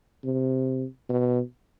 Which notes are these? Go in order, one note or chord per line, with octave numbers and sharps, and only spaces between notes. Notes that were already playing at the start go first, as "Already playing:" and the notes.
C3
B2